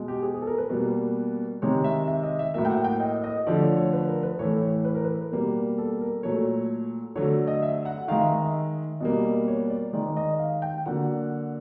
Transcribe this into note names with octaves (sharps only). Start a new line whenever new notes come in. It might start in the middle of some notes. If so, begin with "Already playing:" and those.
Already playing: B2 G#3
G4
G#4
G#4
A4
A#4
B4
B2 G3 A#3
C3 D#3 G#3 C#5
E5
E5
D#5
E5
A2 F#3 A#3 E5
G5
F#5
G5
D#5
D#5
D3 F3 A3 D5
C#5
C#5
B4
A#4
B4
A2 E3 A3 C#5
C#5
B4
A#4
B4
B2 G3 A#3
A4
A#4
A#2 F#3 A3 C#5
D3 F#3 A3 C#5
D#5
E5
F#5
D#3 G#3 F5
E5
D#5
E5
B2 G3 A#3 D#5
C#5
D5
D#3 G#3 D5
D5
D#5
F5
G5
D3 F#3 A#3 F#5